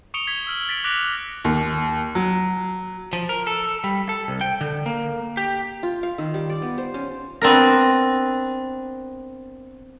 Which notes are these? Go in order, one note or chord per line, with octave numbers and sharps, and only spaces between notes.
C#6 D#6 C#7 D7 F7 G7
G#6 B6 G7
E6 F6 F#7
A6 B6 D7 F7
D6 F#6 A#6 B6 D7 F7
D#2
F#3
F3
A#4
A4
G3
A4
C2
G5
D3
A#3
G4
F4
F5
D#3
G3
D5
B3
C5
C#4
B3 C4 D4 A#4